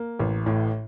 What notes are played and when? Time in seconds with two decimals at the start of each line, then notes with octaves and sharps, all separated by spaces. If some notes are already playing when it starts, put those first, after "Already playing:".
Already playing: A#3
0.19 A1
0.46 A2